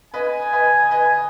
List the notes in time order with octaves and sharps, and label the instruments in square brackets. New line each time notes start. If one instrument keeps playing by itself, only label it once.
[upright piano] B4 D#5 [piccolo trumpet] G#5
[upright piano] B4 D#5
B4 D#5